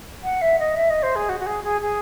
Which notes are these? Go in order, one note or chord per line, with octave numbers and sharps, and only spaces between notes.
F#5
E5
D#5
E5
D#5
C5
G#4
F#4
F#4
G#4
G#4
G#4